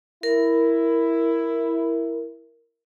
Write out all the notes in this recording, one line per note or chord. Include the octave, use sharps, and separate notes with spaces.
E4 A#4